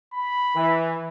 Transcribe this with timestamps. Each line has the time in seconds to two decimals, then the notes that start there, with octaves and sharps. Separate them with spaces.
0.14 B5
0.55 E3